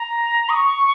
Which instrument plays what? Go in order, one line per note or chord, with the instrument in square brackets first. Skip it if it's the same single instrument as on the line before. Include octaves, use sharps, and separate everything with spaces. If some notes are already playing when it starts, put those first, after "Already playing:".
Already playing: [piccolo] A#5
D#6
C#6